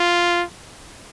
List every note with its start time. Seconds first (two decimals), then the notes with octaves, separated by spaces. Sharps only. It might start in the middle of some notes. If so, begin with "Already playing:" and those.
Already playing: F4